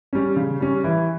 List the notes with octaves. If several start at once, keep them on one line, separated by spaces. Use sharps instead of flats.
G3 C#4
C#3
G3 C#4
E3